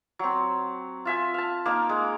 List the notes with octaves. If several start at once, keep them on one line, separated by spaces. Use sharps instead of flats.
F#3 C4
F4 E5 G#5
F5 A5
A#3 D#4 F5
G#3